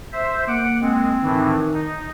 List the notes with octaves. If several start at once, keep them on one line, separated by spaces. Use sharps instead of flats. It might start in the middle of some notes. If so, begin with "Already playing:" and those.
C5 E5
A#3 F#5 D6
G#3 C4
A2 D#3 E3
D#4